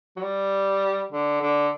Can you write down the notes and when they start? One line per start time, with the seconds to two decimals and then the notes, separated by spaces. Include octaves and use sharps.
0.16 F#3
0.22 G3
1.12 D3
1.41 D3